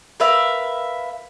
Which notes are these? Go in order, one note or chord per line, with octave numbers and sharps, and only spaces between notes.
A#4 B4 E5 F5